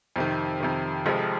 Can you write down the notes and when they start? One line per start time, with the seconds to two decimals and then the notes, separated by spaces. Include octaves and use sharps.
0.16 F2 C3 D#3
0.60 F2 C3 D#3
1.05 F1 F2 C3 F3 G#3